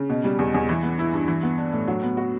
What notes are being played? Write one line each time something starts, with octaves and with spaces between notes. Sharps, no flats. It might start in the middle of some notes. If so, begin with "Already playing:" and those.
Already playing: C#3
B2
G3
E2
E2
E3
B3
E4
G2
E3
B3
D4
A2
F#3
B3
F#4